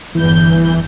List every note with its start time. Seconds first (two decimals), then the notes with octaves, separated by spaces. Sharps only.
0.15 G1 E2 E3 G6